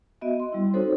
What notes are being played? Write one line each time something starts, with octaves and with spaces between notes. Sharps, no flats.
B3 F#4 D#5 E5
C6
G3 E4
C4 D#4 F#4 A4 C5 C#5